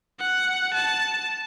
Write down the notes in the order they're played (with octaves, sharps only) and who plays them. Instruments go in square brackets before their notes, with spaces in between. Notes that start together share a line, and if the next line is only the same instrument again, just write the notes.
[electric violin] F#5
A5